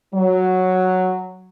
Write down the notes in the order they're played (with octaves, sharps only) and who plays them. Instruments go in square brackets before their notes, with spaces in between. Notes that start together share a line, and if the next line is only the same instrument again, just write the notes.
[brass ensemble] F#3